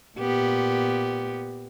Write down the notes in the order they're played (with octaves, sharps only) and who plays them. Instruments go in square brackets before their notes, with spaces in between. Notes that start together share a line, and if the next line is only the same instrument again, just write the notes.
[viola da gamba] A#2 B3 G4